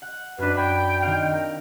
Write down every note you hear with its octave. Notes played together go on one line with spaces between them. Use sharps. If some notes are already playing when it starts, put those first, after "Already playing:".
F#5
F#2 D4 B4
G5 B5 G#6
D#3 C4 F5
A#4